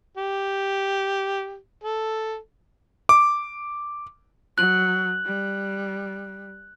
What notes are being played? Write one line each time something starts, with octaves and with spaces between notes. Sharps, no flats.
G4
A4
D6
F#3 F#6 F#7
G3